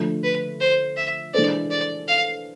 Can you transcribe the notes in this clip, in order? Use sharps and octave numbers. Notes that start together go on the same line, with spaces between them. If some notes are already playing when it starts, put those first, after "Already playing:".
Already playing: D3 F3 A3
B4
C5
E5
E3 G#3 D4 A4 C5 D5
D5
F5